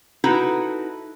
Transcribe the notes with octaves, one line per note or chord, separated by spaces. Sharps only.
D#4 E4 F#4 A4 B4